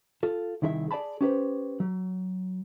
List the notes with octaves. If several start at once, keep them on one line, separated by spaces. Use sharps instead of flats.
F4 A4
C2 D#3 E4 G#4 A#4 E5
G#4 D5 G#5 A5 B5
C#4 G4 B4 C5
F#3